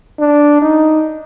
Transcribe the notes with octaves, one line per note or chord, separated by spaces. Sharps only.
D4
D#4